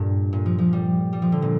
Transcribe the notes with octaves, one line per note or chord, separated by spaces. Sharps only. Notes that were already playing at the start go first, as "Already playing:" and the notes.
Already playing: G2 A#2
A#2
F3
F3
G3
G3
F3
D3
A#2